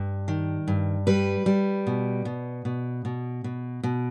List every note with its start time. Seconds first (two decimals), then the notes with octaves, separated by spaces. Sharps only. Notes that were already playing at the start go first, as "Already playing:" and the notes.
Already playing: G2
0.28 D#3
0.68 G2
1.07 G3 B4
1.46 G3
1.87 B2
2.25 B2
2.65 B2
3.05 B2
3.44 B2
3.83 B2